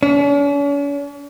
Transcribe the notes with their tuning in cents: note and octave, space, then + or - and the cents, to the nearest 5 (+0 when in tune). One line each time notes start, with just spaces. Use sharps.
C#4 +45